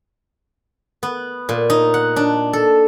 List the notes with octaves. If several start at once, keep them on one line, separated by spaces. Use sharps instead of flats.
B3
A#2
D#4
F#5
D4
A4